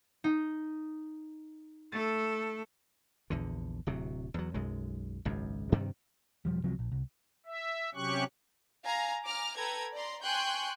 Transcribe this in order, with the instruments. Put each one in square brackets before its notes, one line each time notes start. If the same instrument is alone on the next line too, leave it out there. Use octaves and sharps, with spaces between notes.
[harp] D#4
[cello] A3 A4 [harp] A6
[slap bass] A#1 E2 D3
D1 C3 F#3
E2 F#3
B1 F#2 G#3
G#1 C#2 F#2
G2 C3 D#3 G3
[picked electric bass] E1 D2 F3 G3
C2 C3 F3 F#3
A#1
C2
[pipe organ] E5
C3 F#3 C#4 G4 C#6 F#6
[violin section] F5 G#5 A#5
G#5 A#5 D6 F6
A4 B4 G5 A#5 G#6
D5 A#5 C6
G5 G#5 C6 C#6 F#6 G6